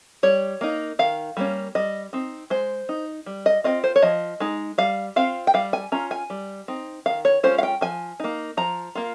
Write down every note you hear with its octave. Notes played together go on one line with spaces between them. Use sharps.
G3 C#5
A#3 D#4
D#3 F5
G3 A#3 C#4
G3 D#5
C4 D#4
G#3 C5
D#4
G3
D#5
C4 F4 D#5
C5
C#5
F3 D#5
G#3 D#4
G3 F5
C4 F4 F5
G5
G3 F5
G#5
C#4 F4 A#5
G#5
G3
C4 D#4
D#3 F5
C#5
G#3 C#4 F4 C5
F5
G5
F3 G#5
A#3 D#4
F3 A#5
A#3 F4